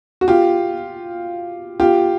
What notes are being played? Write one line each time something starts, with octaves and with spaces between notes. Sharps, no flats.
F#4
F4 G4
F4 G4